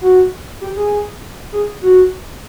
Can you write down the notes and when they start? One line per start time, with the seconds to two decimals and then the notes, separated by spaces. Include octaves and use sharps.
0.01 F#4
0.61 G4
0.76 G#4
1.52 G#4
1.82 F#4